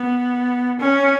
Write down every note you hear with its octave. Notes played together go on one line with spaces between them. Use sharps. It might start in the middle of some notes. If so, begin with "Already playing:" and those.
Already playing: B3
C#4